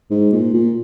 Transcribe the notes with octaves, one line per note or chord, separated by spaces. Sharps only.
G#2
A#2
A#2